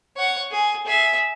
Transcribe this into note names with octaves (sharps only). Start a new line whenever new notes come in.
C#5 F#5
G#4
G#4 E5